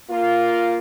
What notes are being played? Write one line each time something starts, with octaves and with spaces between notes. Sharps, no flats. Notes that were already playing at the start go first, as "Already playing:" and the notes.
A#3 F4